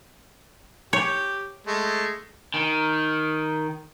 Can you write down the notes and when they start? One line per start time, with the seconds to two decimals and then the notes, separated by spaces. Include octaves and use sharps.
0.93 G4 C#5
1.67 G#3 A3
2.54 D#3